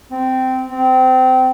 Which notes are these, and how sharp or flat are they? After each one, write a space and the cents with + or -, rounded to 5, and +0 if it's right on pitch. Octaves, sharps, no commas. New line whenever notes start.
C4 -15
C4 -25